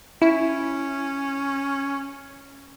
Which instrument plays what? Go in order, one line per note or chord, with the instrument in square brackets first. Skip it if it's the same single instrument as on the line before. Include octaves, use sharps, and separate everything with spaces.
[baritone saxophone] C#4 [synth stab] E4